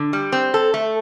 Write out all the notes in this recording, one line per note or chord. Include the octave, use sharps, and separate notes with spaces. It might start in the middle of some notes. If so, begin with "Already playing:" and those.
Already playing: D3
G3
C4
A4
A3